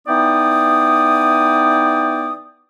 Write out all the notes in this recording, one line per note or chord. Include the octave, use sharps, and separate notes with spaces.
E3 B3 D#4 D5 G5 D#6